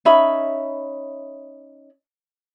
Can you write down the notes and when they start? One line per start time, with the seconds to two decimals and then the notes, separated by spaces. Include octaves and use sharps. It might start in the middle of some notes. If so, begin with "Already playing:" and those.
0.05 C#4 D#4 E5 B5